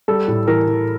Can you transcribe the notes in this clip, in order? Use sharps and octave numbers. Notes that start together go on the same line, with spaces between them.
G3 A4
A2
E3 A#4
E3